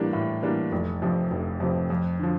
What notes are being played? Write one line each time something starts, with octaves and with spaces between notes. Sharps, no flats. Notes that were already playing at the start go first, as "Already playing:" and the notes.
Already playing: A2 E3 G3 A#3 D4
A2
E3 G3 A#3 D4
F1
F2 C3 F3
F1
F2 C3 F3
F2
D3 F3